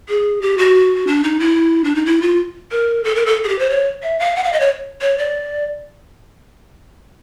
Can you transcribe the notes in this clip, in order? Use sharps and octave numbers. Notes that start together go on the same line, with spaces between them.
G#4
G4
F#4
D4
D#4
E4
D4
D#4
E4
F4
A#4
A4
A#4
A4
G#4
G4
C5
C#5
E5
F5
F#5
F5
D#5
C#5
C#5
D5